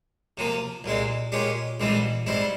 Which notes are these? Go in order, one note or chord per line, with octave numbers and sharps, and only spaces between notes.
C3 F3 A#3
C2 A#2 G#3 C4
A#2 G#3 C#4 G4
A#1 G#2 E3 G3 C4
G#2 G3 C4 E4